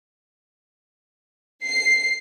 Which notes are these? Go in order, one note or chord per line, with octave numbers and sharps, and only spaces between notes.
C7